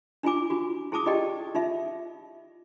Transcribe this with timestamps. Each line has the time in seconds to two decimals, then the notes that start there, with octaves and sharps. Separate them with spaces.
0.23 D4 E4 F4 G#5 D6
0.50 F4 F#4
0.92 E4 G#4 A5 D6 D#6
1.06 D#4 F4 G4 D5 D#5 G5
1.55 D#4 F4 E5